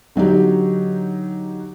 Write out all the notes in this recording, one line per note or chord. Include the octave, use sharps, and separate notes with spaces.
D3 F#3 D#4 G4